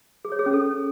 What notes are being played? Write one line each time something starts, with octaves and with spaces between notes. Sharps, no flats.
G#4
C#5
G#4
C#4
A4